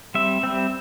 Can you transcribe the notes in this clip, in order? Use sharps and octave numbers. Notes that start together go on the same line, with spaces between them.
G3 C4 E5
G3 C4